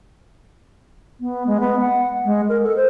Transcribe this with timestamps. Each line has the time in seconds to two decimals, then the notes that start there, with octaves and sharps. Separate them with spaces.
1.20 B3
1.47 G#3
1.60 B3
1.79 F#5
2.25 G#3
2.49 A#4
2.63 A4
2.76 C5